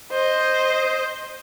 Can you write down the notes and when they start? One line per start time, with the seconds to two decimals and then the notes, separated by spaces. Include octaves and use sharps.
0.12 C5 D#5